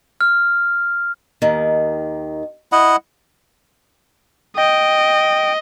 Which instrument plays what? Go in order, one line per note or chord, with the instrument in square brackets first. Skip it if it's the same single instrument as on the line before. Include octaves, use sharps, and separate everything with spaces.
[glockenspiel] F6
[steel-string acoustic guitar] D#2 D#3
[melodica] E4 D#5 F#5
[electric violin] D#5 [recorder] G5